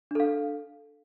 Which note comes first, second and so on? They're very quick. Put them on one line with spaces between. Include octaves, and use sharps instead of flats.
D4 A4 F5